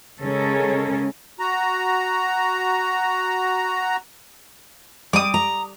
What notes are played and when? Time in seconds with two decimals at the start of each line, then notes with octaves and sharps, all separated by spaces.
0.21 C#3 G#3 C#4 A4 A#4
1.39 F#4 A#5
5.13 G3 D6 D#6
5.34 A#5